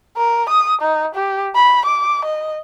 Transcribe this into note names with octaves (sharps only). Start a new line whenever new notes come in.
A#4
D#6
D#4
G4
B5
D6
D#5